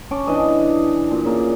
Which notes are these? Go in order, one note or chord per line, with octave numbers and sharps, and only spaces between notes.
C#4 A5 C#6 D6
E3 D4 D#5
A#2
C#3 A#3